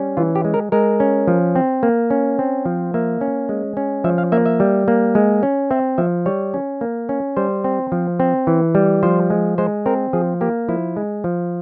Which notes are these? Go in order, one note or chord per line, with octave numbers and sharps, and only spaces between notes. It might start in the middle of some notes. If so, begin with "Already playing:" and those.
Already playing: G3 C#4
E3 F4
G4
G#3
A#4
G#3 A#4
C#4
F3
C4
A#3
C#4
C4
F3
A#3 E5
C#4
G#3
C#4
F3 E5
F5
A#3 E5
E5
G3
A#3
G#3
C#4
C4 E5
F3 E5
G3 C#5
C#4
A#3
C#4
G3 C5
C4
F3
C4
E3
G3
F3 C5
G#3
G#3 C5
C4 A#4
F3 G#4
A#3 G4
F3 E4
G#3
F3